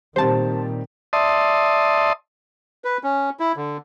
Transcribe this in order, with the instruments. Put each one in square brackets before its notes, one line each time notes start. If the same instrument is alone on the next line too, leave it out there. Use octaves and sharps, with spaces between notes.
[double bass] A#2 D#3 [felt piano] G3 C4 G4 [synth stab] C5 A5
[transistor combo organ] D5 E5 A5 C6 D#6
[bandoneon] B4
C#4
E4
D3